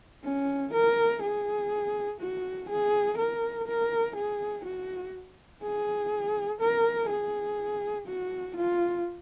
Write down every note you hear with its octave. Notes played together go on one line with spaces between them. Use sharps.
C#4
A#4
G#4
F#4
G#4
A#4
A#4
G#4
F#4
G#4
A#4
G#4
F#4
F4